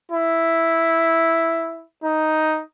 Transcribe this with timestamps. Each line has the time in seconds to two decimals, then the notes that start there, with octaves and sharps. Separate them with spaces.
0.11 E4
2.04 D#4